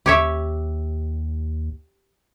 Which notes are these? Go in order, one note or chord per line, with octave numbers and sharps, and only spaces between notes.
D#2 G4 C#5 E5